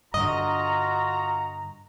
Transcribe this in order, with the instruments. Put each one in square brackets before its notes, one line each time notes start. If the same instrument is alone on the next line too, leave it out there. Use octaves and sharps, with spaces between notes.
[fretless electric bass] G2 D3 [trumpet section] F4 F#4 [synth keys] D#5 [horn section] A#5